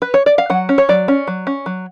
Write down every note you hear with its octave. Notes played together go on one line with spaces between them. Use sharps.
B4
C#5
D5
F5
F#3 F#5
C#4
C#5
F#3 D5
C#4
F#3
C#4
F#3